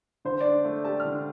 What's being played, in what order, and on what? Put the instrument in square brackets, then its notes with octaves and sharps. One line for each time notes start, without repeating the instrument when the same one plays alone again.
[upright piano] D3 [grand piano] C5
[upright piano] D4 [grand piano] D5
[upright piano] A3
[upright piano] G4 [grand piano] A5
[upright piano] D3 [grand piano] F6
[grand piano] F6